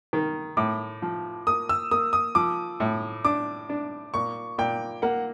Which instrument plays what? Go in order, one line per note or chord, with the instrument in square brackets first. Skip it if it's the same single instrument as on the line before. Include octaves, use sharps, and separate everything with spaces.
[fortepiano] D#3
[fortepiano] A2 [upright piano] D6
[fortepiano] F3
[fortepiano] A#3 [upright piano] D#6
[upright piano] E6
[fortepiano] A#3 [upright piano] D#6
[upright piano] D#6
[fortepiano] F3 [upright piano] D6
[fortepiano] A2
[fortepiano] D4 [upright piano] D6
[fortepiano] D4
[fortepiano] A#2 [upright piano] C#6
[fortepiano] A#2 [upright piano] G5
[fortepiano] A#3 [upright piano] F#5